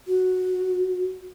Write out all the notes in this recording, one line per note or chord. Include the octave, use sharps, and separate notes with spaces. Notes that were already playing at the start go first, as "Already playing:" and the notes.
F#4